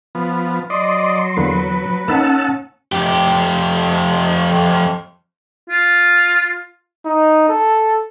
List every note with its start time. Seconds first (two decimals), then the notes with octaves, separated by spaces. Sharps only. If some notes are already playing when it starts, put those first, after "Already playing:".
0.15 F3 B3
0.70 F#3 D5 D#5 C6
1.37 E2 D3 A#3 B4
2.08 A#3 C#4 D#4 F#5 A5 E6
2.92 F2 G4
5.70 F4
7.05 D#4
7.49 A4